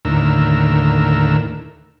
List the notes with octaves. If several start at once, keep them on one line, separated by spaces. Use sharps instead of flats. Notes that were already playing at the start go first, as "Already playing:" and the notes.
D#2 A2 D3 A#4 E6